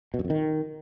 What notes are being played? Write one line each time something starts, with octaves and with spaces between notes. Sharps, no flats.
B2
F#2
F2
D#3